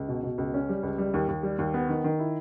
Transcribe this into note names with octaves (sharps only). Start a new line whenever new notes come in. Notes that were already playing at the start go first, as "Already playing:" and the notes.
Already playing: C#2
B2
B2
C#2
C#4
G3
C#2
G3
D#2
D#2
G3
D#2
B3
D#3
D#3
E4